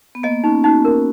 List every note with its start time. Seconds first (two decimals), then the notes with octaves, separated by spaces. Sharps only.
0.15 B3
0.23 A#3 D#5
0.44 C#4 D#4
0.64 D#4 F#4
0.85 A#4